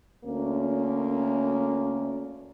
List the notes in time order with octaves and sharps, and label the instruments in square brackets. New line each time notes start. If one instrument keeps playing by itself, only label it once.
[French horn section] D2 A#3 C#4